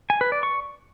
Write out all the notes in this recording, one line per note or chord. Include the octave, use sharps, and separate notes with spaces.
G#5
B4
D5
C#6